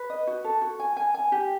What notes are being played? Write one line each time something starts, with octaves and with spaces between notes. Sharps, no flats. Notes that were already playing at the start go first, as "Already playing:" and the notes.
Already playing: B4
D#5
F#4
A4
F#4
G#5
G#5
G#5
G4